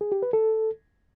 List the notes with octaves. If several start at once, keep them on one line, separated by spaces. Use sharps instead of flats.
G#4
G4
B4
A4